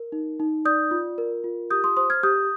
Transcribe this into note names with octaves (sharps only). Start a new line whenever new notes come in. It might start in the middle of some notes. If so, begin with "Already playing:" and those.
Already playing: A#4
D#4
D#4
D5 D#6 G6
F4
A#4
F4
G4 D#6 G6
C6 D#6
C5 C6 D#6
F6 G#6
G4 D#6 G6